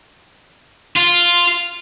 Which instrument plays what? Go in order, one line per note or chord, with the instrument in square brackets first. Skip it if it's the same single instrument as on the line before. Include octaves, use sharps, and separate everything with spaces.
[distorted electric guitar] F4